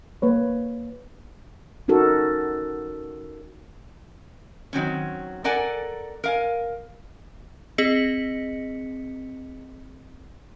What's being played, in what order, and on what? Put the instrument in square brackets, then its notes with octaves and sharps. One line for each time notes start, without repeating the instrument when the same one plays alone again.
[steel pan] A#3 B4 C#5
[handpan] C#4 D#4 F#4 A4 A#4
[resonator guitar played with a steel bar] D#3 F#3 C4 C#4
A4 A#4 D5 F#5 G#5
A#4 F5 G#5
[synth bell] C4 G#4 D#5 B6 C#7